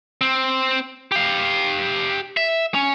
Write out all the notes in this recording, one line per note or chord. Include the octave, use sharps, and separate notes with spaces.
C4
G4 F5
E5
C#4